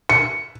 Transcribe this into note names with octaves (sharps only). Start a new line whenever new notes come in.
C#7